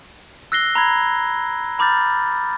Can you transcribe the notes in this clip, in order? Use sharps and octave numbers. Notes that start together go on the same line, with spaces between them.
E6 F#6 A#6 C7 G7
A#5 B5 G#6
A#5 B5 D6 F6 G6 A6